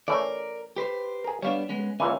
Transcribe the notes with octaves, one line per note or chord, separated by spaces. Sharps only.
E3 A3 C#4 A#4 D5
G4 B4 C5
G#4 A#4
G3 B3 D4 C#5 F5
G#3 B3 C#4
C#2 A#2 E3 C#4